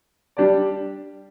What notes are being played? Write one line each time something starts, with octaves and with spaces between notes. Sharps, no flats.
G3 D4 G4 D5